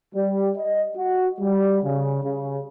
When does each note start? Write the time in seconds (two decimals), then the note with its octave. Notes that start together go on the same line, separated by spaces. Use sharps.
0.15 G3
0.57 D#5
0.96 F#4
1.41 G3
1.83 C#3
2.23 C#3